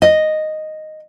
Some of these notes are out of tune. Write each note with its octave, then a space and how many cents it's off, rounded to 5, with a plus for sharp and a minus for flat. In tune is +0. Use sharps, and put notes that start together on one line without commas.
D#5 -5